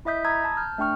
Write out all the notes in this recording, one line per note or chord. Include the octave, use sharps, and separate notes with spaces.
E4 D#5 E5 D#6 G6 B6
A#5 B5 D#6 E6 G#6
A5
F6 G6
A3 D4 G5 C#6 F6